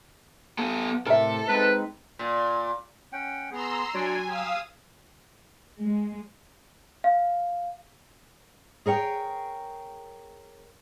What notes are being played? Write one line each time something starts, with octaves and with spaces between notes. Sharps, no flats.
B3 A4
A2 C3 A4 A#4 E5
G#3 C4 D#4 B4
A#2
C#4 F#5 G5
B3 G#4 A#5 C6 E6
F#3 D4 C#5 D5 G#5
G4 F5 D#6 E6
G#3
F5
G#4 A#4 C#5 G5